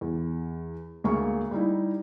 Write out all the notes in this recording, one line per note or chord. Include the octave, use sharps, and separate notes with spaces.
E2
D2 G#3 A#3 F5 C#6
G3 D#4 E4